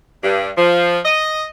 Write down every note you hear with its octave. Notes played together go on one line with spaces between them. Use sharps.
G2
F3
D#5